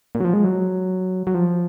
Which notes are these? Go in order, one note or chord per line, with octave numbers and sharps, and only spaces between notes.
A#2
F#3
F3
G#3
F#3
F#3
F3